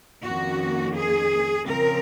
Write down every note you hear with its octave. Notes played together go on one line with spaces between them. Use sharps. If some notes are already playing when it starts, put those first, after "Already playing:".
F2 D#3 A#3 C#4 F#4
G#4
C#3 F3 C4 A#4